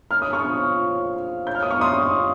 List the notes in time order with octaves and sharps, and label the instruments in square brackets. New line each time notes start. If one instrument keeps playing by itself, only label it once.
[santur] C#4 [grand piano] F6
[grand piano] D#6
C#6 F6
[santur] F3
C#5
F5
[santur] C#4 [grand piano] G6
[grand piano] F6
D#6
C#6 F6
[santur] G3 [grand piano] C6 D#6
[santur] F4